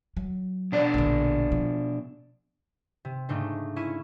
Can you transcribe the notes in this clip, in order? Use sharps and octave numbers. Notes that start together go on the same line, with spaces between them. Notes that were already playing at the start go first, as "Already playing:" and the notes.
F#3
B2 D4 D5
A#1 D3
F3
C3
G#2 C#3 A3 D4 D#4
C#4 E4 C#6 D#7